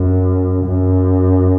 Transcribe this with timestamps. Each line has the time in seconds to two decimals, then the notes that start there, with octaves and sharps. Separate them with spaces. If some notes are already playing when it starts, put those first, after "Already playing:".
Already playing: F#2
0.66 F#2